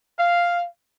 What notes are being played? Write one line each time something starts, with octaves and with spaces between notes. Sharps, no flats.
F5